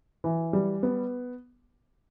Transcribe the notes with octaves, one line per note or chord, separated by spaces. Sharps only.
E3
G3
B3